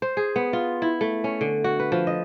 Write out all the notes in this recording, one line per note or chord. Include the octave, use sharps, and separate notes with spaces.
C5
G#4
B3
F4
E4
A3
C#4
D3
F#4
B4
F3
D#5